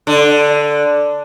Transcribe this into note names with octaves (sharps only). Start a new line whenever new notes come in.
D3